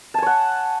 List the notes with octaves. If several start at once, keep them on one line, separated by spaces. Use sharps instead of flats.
C#5 F#5 G#5 A5